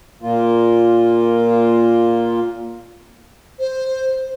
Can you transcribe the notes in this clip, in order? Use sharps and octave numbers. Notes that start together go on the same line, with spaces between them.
A#2 A#3 F4
C5